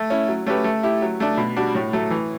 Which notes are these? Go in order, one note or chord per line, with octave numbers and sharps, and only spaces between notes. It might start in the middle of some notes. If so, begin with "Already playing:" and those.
Already playing: A3
C#4 E4
F#3
A3 C#4 G4 B4
A3
E4 G4
F#3
A3 D4
B2
G3 D4 F#4
A2
F#3 A3
E3